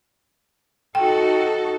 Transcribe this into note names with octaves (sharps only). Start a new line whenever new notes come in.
D#4 F#4 A4 G5